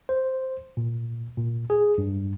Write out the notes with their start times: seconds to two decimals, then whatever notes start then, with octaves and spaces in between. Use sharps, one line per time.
0.09 C5
0.77 A#2
1.37 A#2
1.70 G#4
1.98 G2